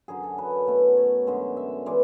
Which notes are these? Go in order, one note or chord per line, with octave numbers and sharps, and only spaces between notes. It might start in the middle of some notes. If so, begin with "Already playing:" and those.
F#2 D3 F#3 G#4
A4
B4
B2 A3
C#5
F#2 D3 G#3
E5
E3 G#3 D5